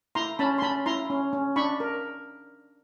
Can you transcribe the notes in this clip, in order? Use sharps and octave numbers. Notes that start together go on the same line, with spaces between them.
E4 A#5 C6
C#4 A5 B5
C6
C#4 A5 B5
E4 A#5 C6
C#4
C#4
D4 B5 C#6
A#4